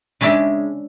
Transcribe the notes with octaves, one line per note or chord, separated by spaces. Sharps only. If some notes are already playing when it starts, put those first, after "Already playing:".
C#3 G#3 D4 E5